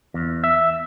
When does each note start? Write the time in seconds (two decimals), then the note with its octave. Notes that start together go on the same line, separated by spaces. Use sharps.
0.14 E2
0.44 E5